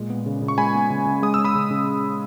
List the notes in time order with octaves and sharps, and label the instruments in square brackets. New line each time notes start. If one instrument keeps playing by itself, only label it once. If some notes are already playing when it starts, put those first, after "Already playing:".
Already playing: [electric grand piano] A#2 G#3
B3
C#3
C#3
C#6
G#3 G#5 B5
B3
C#3
C#3
G#3 D#6
C#4 E6
B5 D#6
C#3
C#3